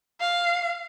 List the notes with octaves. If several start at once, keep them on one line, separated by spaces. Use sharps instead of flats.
F5